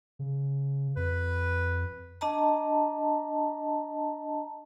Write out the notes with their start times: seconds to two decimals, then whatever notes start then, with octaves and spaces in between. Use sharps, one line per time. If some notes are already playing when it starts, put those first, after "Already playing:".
0.19 C#3
0.96 F2 B4
2.21 D4 D#5 A5 A#5